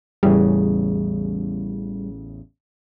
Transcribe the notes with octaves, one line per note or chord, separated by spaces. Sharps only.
A1 E2 C#3 G3